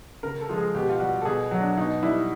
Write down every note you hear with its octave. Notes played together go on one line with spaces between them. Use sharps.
C#3 A#4
A4
F3 G#3
G#4
B2 G4
F4
G3 F#4
A4
B2 G#4
F#3
D4
B2 D#4
G3 E4